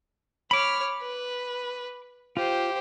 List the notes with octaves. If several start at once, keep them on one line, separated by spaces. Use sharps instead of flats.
C#5 B5 D6 F6
B4
F4 G4 C5